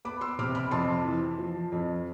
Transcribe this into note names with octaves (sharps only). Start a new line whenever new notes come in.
B3 B5 D6
C6 E6
C3 D6 F6
B5 D6
F2 A5 C6
E3
F3
F2